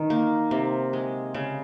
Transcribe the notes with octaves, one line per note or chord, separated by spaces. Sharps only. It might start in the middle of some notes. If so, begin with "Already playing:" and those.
Already playing: D#3 D#4
A#3
C3
G#3
C#3